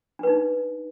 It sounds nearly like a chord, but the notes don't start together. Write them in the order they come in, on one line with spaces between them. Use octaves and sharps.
D4 B4 D#4